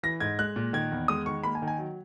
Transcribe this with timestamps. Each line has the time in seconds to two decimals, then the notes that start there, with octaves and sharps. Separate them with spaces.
0.03 E3 A#6
0.20 G#2 G#6
0.39 G#3 F#6
0.56 A#2
0.73 D#3 G#6
0.92 E2
1.08 G#3 D#6
1.26 D#3 C#6
1.43 A#3 B5
1.55 G#5
1.62 D#3
1.68 G#5
1.79 F#3